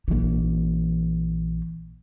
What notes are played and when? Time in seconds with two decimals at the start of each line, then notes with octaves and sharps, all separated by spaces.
0.08 A#1 E3